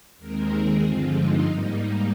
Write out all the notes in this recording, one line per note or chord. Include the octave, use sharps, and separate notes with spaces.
D#2 D#3 G#3 C4 A#4
G#4
G2 D3 F3 G#3 C4 F4
D#4
G#2 G3 A#3
D#4